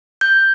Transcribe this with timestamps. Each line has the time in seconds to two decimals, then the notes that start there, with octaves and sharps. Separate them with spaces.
0.21 G6